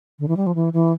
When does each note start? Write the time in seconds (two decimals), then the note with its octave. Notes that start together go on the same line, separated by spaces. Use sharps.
0.19 D3
0.28 E3
0.37 G3
0.46 F3
0.55 E3
0.73 E3